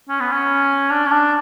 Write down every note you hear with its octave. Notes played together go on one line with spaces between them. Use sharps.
C#4
B3
C#4
D4
C#4
D4